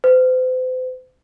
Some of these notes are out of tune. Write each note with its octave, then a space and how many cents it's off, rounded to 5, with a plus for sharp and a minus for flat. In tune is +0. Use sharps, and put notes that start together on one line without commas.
C5 -40